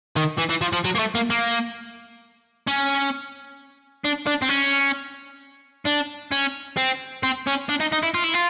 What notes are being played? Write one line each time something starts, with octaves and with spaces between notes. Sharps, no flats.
D#3
E3
E3
F3
F3
F#3
A#3
A3
A#3
A#3
C#4
D4
D4
C4
C#4
D4
C#4
C4
C4
C#4
D4
D#4
D#4
E4
F4
E4
F4